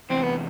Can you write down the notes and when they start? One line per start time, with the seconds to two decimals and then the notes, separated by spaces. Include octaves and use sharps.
0.10 E2 C3 E3 C4
0.23 B3